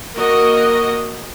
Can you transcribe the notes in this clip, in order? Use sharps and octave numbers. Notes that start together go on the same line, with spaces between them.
A#3 F#4 A#4 D#5